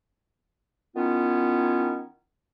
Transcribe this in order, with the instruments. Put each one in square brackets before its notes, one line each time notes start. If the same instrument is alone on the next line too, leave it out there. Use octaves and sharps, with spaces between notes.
[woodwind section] D#3 B3 C#4 E4 F4